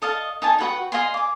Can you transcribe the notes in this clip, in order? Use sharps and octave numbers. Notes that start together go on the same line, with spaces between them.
A4 D#5 F5 A5
D#4 D#5 G#5 A5
F#4 B4 F#5 G5
D#5 F5 G#5 C6
G#5 D6